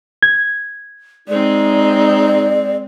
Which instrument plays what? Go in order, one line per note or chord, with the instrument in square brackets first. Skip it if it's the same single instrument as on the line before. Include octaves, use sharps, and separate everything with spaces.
[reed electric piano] G#6
[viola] G#3 C4 [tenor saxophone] D#4 [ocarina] D5